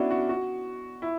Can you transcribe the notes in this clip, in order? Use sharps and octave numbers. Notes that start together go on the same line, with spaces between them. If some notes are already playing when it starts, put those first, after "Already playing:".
Already playing: B3 C#4 D4 E4 F#4
F#4
F#4
E4